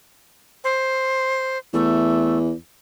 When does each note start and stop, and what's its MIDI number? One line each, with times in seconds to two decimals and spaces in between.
0.64 1.58 72
1.73 2.52 40
1.73 2.38 57